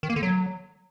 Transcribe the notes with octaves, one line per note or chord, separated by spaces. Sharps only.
D#3
A#3
D3
F#3